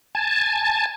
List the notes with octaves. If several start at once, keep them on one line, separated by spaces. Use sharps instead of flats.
G#5 A5